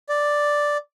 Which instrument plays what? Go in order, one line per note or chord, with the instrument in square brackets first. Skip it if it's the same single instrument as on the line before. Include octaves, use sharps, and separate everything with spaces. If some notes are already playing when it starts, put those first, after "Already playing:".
[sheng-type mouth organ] D5